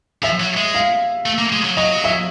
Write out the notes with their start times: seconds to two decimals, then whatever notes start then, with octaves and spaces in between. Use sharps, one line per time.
0.23 F3 E5
0.40 F#3
0.57 G#3
0.74 F5
1.26 A3
1.38 A#3
1.52 G#3
1.65 F#3
1.77 F#3 D#5
2.04 E5